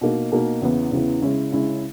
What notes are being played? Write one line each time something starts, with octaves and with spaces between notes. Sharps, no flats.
B2 A#3 D#4
B2 A#3 D#4
E2 C#3 E3 B3
E2 C#3 E3 B3
C#3 G#3 C#4 E4
C#3 G#3 C#4 E4